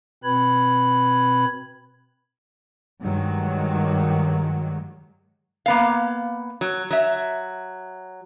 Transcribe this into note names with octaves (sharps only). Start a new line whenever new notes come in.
B2 C4 B4 B5 G#6
G2 D#3 F#3 G#3
A#3 B3 F5
F#3
F#3 E5